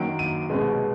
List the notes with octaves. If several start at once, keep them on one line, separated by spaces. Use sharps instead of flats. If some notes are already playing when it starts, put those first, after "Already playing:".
Already playing: F#2 D#3 F#3 A#3 D7
D#7
C2 B2 G#3 C#4